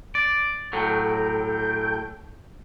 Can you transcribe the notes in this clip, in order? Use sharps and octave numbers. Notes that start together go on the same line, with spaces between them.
D5
A2 F#3 A4 G5